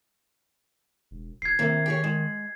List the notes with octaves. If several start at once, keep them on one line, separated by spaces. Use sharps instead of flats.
E1
F1 G#6 C7
C3 D#3 A#3
G4 G#4 C#5
G#3